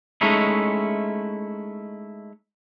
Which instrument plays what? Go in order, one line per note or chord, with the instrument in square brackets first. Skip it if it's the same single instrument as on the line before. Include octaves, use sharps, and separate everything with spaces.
[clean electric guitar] G#3 A3 C#4 D#4 E4